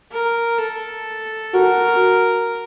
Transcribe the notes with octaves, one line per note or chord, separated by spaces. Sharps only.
A#4
A4
F#4 A#4